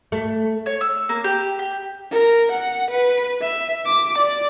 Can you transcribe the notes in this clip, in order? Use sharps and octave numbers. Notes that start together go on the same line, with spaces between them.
A3
C#5
E6
A#3
G4
G4
A#4
F#5
B4
E5
D6
D5